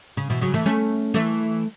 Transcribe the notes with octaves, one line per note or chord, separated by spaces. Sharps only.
C#3
B2 E3
C#3 F#3
E3 A3
A3 C#4
E3 A3